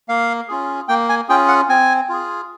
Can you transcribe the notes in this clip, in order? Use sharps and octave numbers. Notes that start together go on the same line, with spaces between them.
A#3 F5
C#4 F4 G#4
A#3 G5
G#5
C#4 F4 G#4 G5
F#5
C4 G#5
F4 G#4